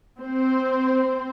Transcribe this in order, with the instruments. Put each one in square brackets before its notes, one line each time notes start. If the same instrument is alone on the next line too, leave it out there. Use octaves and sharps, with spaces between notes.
[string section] C4 C5